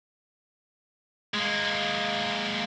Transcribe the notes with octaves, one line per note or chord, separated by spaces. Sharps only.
G#3 A#3